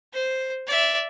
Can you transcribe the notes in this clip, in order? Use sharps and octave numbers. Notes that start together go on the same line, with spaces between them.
C5
D5 E5